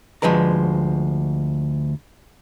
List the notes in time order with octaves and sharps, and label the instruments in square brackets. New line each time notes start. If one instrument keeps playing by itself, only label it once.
[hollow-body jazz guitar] D2 F3 G#3 B4 A#5